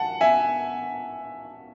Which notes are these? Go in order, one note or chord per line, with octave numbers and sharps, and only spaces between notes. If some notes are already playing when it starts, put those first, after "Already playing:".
Already playing: F#5 A5
E5 G#5